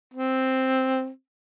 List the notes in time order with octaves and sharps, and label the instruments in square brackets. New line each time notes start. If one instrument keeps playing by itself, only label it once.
[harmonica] C4